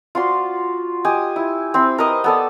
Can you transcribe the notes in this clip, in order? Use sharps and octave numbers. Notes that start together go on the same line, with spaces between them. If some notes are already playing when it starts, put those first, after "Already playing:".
F4 F#4 D5 C6
G4 D#5 G#5
E4
C4 E4 C5
A#4 B4 D#5 D#6
B3 A4 D5